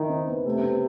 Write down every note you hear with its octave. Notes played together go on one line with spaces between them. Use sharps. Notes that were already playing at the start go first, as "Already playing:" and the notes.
Already playing: D#3 E4
C4
B3
C3 A3
B3
C4